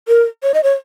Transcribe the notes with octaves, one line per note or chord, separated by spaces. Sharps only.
A#4
C#5
D#5
C#5